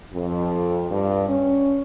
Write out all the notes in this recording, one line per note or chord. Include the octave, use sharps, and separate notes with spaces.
F2
G2
C#4